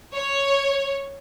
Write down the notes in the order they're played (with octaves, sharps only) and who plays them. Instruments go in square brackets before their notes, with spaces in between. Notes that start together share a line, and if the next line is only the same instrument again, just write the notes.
[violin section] C#5